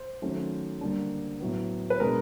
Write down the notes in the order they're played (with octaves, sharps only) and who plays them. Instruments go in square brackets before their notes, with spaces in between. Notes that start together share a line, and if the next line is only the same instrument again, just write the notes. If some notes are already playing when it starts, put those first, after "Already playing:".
Already playing: [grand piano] C5
D#3 F#3 A3 C#4
D3 G3 A#3 D4
A2 F#3 B3
B4
B2 G#3 B3 D4 A#4